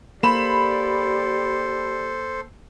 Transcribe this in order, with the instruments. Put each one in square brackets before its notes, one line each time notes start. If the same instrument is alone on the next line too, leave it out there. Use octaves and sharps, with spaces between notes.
[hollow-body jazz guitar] A#3 [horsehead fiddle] G4 D5 [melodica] A4 C5 [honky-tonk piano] B5 E7